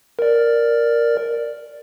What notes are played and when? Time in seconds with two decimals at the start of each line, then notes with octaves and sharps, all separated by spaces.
0.19 A#4 D5